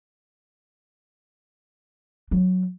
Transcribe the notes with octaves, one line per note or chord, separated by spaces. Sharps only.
F#3